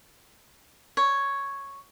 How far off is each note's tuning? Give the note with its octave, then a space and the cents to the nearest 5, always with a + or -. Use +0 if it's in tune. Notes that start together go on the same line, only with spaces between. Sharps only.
C#5 +0